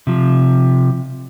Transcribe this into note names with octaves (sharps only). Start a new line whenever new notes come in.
C3 F3